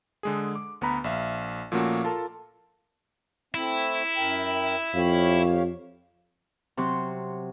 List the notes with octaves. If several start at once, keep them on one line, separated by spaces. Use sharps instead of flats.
D3 G#3 G#4
D6
D2 B3 B4 A#5 B5
A#1 E5 F5
A#2 F3 A3 A#3 C#4 F#4
F4 A4 A#4 A5
A3 C4 E4
F#2 A#4 G5
F2 G4 C#5 F5
C3 F#3 F#4 C6